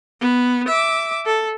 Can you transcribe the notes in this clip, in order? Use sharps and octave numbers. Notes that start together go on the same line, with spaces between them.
B3
E5 D6
A4